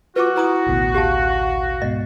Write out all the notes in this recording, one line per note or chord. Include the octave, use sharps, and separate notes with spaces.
F4 F#4 B4 D6
E4 B4 A#5 D#6
A1 D2 B2
G4 F5 A5
G#2 B2 D#5